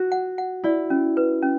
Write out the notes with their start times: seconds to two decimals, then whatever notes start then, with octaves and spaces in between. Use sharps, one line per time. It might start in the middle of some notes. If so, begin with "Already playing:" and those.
Already playing: F#4
0.12 F#5
0.38 F#5
0.64 E4 D5
0.90 C#4
1.17 B4
1.42 C#4